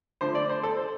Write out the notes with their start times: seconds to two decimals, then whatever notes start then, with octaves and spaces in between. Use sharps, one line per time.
0.21 D3 F3 A3 C5
0.35 D5
0.50 C5
0.63 A4
0.77 C5